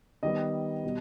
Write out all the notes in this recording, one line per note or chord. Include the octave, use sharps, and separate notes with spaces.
D#3 G3 B3 D#5
B2 G3